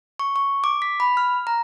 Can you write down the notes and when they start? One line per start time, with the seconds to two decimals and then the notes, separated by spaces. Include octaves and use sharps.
0.19 C#6
0.36 C#6
0.64 D6
0.82 B6
1.00 B5
1.17 F6
1.47 A#5